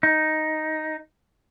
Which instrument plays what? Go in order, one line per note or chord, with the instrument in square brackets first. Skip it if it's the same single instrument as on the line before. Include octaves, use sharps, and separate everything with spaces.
[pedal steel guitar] D#4